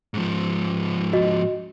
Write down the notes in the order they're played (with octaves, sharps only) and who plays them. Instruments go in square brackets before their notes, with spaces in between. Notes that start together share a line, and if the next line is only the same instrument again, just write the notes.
[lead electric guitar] G#2 F3
[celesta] F#4 D#5